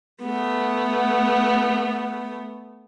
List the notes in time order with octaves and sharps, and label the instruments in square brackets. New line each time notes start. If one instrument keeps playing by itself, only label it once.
[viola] A3 B3